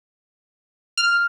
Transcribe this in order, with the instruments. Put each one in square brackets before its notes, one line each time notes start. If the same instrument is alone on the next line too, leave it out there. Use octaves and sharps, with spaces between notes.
[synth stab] F6